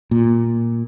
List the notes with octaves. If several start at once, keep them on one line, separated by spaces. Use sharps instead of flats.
A#2